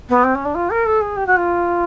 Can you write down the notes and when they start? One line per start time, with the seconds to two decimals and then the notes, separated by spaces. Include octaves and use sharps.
0.09 B3
0.23 C4
0.35 C#4
0.45 D4
0.54 F4
0.70 A#4
0.85 A4
1.01 G#4
1.16 G4
1.26 F#4
1.36 F4